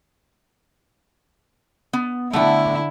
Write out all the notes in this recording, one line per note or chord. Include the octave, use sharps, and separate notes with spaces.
B3
D3 A3 E4 F#5 G5